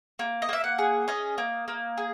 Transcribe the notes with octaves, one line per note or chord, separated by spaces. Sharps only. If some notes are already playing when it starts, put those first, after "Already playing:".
A#3
D#5
A#3 E5
F#5
G#4
C#4 D#5
A#3
A#3
G#4